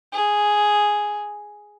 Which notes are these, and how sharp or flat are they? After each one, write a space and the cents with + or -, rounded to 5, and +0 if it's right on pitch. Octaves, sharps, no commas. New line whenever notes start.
G#4 +0